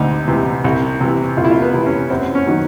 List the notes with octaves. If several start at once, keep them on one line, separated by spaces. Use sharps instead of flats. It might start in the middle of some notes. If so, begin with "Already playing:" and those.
Already playing: D2 C3 D#4
C3 E3
C2
C3 E3
C2 F4
E4
F4
B3
C3 E3
C#4
F#2 C4
C#4
D#3 F#3